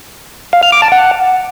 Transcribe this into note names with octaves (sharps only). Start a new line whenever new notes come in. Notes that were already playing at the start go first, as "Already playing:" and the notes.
F5
F6
D6
A5
F#5